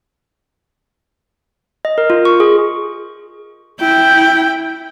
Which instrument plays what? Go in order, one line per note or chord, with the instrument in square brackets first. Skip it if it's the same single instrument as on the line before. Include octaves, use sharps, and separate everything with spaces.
[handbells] D#5
A#4
F4
C#6
G#4
[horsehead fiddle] E4 G5